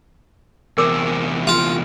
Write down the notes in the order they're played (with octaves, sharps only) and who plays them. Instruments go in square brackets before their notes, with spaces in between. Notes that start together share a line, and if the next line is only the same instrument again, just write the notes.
[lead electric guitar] E2 C3 [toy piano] A#4 D6 E6
[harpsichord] F4